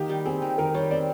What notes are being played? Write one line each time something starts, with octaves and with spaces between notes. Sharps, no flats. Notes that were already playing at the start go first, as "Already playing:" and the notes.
Already playing: D#3 A#3 G4
G3
C4 G#4
D#3
D#3 A#4
G3 C#5
C4 D5